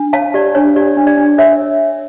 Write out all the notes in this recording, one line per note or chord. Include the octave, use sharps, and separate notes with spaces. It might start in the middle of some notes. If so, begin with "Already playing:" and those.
Already playing: D4
C#5 F5 A5
G4 D5
D4 C#5
G4 D5
D4
D5
D4
A#4 C#5 E5